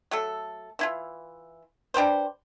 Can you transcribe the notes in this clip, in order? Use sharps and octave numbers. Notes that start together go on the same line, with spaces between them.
F#3 A3 A4
E3 E4 F4
D4 G4 B4 C5